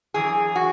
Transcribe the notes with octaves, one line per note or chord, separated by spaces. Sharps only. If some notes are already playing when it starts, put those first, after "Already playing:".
F#2 E3 G#4
F#4